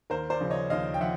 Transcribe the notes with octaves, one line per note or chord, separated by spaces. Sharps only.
D#2 A#4 C5
C5 D5
C#3 F3
C#5 D#5
D#2 D#5 F5
G5
F3 E5 F#5